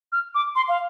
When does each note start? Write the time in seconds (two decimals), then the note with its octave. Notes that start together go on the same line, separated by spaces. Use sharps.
0.12 F6
0.35 D6
0.55 C6
0.69 F5